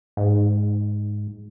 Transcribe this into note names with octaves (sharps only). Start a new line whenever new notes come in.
G#2